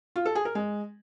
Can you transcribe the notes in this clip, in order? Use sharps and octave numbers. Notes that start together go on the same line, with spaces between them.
F4
A4
G#4
A#4
G#3